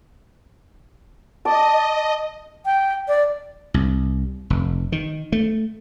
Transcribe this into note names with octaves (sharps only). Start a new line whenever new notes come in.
D5 D#5 A5
G5
D5
C2
F1
D#3
A3